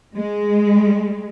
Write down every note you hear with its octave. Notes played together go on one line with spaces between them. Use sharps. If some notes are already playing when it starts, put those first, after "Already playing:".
G#3